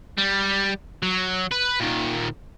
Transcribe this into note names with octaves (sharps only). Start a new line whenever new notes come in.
G3
F#3
B4
A#2 D#3